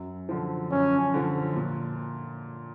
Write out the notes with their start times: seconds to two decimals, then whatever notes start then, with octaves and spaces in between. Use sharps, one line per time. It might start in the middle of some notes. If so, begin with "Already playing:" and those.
Already playing: F#2
0.29 D3 F3
0.72 F#2 C#4
1.14 D3 F3
1.56 A#2